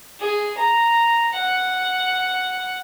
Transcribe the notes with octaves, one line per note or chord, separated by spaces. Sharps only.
G#4
A#5
F#5